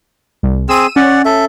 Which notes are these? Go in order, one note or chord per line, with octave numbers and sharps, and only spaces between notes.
C2
C4 G#4 E6 D#7 E7
C#4 D5 F#5
A4 E5